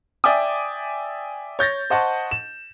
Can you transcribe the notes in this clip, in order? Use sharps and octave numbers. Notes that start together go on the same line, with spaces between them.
D5 E5 G5 G#5 D6 D#6
C#5 G6 A6 A#6
C5 D#5 F#5 A5 C#6
E7